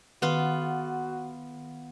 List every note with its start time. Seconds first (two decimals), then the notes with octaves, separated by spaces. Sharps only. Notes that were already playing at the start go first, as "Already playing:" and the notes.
0.22 D#3 B3 F4 F#4